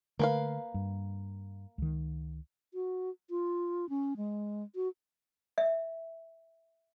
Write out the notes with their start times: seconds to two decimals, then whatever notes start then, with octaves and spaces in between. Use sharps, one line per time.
0.19 D3 A3 A#3 B4 F5
0.74 G2
1.78 C#2 D#3
2.74 F#4
3.30 F4
3.89 C#4
4.17 G#3
4.75 F#4
5.58 E5